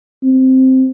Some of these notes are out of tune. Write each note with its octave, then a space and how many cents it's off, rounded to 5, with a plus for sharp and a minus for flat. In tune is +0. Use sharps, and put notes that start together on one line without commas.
C4 -5